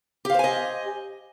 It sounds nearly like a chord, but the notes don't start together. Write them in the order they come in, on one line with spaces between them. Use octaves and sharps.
G4 F5 C5 G#5 D#5